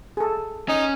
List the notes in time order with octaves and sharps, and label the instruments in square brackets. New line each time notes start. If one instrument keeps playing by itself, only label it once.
[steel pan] G#4 A4
[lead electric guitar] C#4 [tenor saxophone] D#4